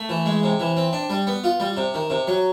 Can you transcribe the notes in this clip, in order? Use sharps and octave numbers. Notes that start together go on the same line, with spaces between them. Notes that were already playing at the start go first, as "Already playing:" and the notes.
Already playing: A3
E3
G#3
C3
E3
C4
D4
G3
B3
F4
G3
C3
D#3
C3
F#3